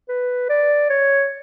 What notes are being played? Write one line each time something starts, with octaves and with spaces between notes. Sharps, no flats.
B4
D5
C#5